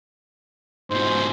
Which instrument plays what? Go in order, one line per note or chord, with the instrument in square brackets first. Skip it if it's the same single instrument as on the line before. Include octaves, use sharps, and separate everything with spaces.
[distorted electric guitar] G#2 B2 [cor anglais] C5